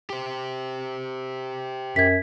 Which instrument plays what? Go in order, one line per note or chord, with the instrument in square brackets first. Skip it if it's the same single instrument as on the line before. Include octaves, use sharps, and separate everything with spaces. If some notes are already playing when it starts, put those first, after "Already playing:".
[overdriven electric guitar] G4 C5
[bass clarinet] F#2 [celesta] G#6 B6